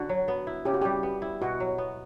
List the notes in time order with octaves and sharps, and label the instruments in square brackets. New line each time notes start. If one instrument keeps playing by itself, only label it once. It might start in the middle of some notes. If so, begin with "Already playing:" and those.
Already playing: [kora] D3 [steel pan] F#4
[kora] F#3
B3
E4
[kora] C#3 [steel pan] G4
[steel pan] F#4
[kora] G3 [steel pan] G4
[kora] B3
E4
[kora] B2 [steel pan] F#4
[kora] F#3
B3